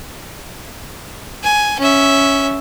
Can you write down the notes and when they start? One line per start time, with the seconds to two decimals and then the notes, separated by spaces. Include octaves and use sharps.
1.43 G#5
1.79 C#4 E5